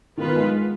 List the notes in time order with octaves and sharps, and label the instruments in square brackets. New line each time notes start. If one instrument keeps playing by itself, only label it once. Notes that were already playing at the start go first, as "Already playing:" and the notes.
[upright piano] D#3 [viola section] B3 F4 B4
[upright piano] G#3